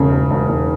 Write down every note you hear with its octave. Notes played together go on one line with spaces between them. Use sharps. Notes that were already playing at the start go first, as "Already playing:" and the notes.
Already playing: E1 C#3
E1
E1
E1